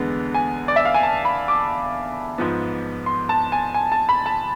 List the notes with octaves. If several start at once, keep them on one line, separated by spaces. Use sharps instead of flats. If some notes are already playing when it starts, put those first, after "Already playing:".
Already playing: E2 D3 G#3 B3
G#5
D5
E5
F5
G#5
A5
B5
D6
G#2 F3 B3
C6
A5
G#5
G#5
A5
B5
A5